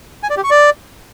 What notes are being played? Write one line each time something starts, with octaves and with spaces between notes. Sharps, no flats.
G#5
D5
G4
C#6
D5